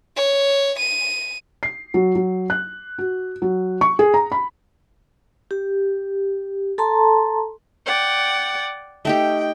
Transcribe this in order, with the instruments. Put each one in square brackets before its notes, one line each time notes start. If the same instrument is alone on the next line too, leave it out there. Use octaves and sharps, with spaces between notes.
[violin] C#5
D#7
[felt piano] C7
F#3
F#3
F#6
F#4
F#3
C#6
G#4
A#5
B5
[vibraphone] G4
A4 A5 A#5 C6
[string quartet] D5 F#5 G5
[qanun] A3 D#4 G4 [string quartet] G5